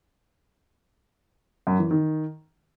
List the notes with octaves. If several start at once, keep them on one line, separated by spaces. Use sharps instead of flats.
F#2
E3
D#3